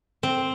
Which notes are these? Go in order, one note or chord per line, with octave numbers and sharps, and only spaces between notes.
C4